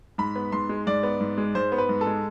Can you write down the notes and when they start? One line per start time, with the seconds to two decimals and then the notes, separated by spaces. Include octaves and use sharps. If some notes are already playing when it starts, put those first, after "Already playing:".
0.18 G#2 B5
0.36 B3
0.52 G#2 C6
0.69 G#3
0.87 G#2 D5
1.03 B3
1.21 G#2
1.38 G#3
1.55 G#2 C5
1.72 B3
1.78 B4
1.89 G#2
2.01 A4
2.07 G#3